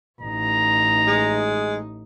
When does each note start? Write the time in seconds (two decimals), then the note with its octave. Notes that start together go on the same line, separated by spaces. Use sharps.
0.21 A1 D#4 A#5
1.07 G#3